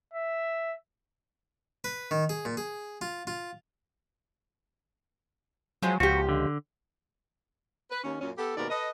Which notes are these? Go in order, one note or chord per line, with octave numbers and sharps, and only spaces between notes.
E5
B4
D#3
G#4
A#2
G#4
F4
F4
F3 F#3 G#3 C5
C#2 F3 F#4 G4
D3
B4
D#2 C#4
F#2 A#2 C#4
B3 G4 A4
D#2 G#2 B2 A#4 D5
A4 B4 D#5